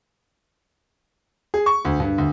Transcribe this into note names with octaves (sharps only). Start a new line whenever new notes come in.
G#4
C#6
D2
G2
D2